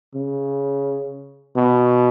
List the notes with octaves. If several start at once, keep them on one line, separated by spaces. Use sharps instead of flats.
C#3
B2